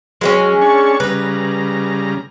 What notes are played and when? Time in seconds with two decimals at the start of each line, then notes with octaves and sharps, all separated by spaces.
0.21 F#3 G#3 B3 C#4
0.61 D4 C#5 C#6
1.00 C#3 G3 B4 A#5